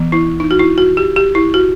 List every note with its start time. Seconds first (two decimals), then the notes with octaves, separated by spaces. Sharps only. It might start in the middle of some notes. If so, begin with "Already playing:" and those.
Already playing: E3 B3
0.12 E4
0.40 D#4
0.51 F#4
0.59 E4
0.78 F#4
0.97 G4
1.16 G4
1.35 E4
1.54 F#4